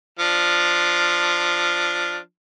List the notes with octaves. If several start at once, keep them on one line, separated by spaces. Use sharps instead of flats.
F3 D4 F6